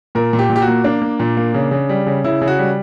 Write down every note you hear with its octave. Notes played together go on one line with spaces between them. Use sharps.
A#2 A#4
A#2
G4
A#2
G4
F#4
A#3
A#3 D4
A#3
A#2
A#3
C#3
C#3
G3
C#3
C#3 E4
C#3
F#4
G3